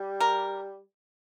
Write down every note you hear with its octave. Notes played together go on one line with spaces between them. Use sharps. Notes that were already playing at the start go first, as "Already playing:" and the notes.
Already playing: G3
A#4